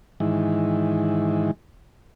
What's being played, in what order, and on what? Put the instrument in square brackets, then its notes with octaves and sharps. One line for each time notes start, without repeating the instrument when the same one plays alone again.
[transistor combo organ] G#2 D#3 E3